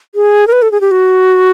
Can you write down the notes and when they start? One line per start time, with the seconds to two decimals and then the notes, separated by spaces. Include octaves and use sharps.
0.15 G#4
0.47 A#4
0.52 B4
0.62 A4
0.72 G#4
0.81 G4
0.91 F#4